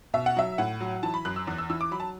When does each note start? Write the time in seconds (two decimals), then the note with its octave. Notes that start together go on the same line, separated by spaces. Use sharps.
0.14 B2 E5
0.26 F#5
0.36 F#3 E5
0.58 A2 F#5
0.81 F#3
1.03 E3 A5
1.14 B5
1.25 F#2 F#6
1.36 E6
1.47 E2
1.58 E6
1.70 E3 E6
1.81 D6
1.91 F#3 B5
2.00 A5